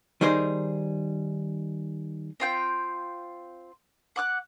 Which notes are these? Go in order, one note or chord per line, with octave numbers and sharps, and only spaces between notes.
D#3 G3 D#4 G#4 C5
C4 F4 G5
F#5 D6 F#6